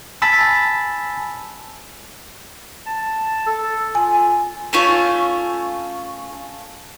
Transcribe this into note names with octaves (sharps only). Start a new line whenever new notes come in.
G#5 A5 B5 E6 A6 B6
A5
A4
F4 G#5
A3 C#4 F4 G#5